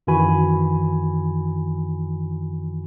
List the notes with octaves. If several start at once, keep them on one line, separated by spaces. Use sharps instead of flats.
F#2 D#3 E3 F#4 G#5 B5